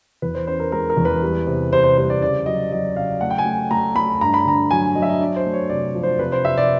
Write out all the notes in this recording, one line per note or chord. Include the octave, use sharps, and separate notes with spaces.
E2 B4
C5
C#4 C5
A#4
G#3 A#4
A#4
E2
B4
G3
C3
C3 C5
C5
G3 C5
D5
C#3 D5
F#3 D#5
F#3 D#5
C#3 F5
A3 F#5
G5
G#5
A3
A3 A#5
A3 B5
G2 A#5
B5
D3 A#5
F#3 G#5
F#3 D#5
E5
D#5
D4 D5
C5
A3
C#5
C3 D5
F3
C5
C3 B4
C5
C3 E5
D5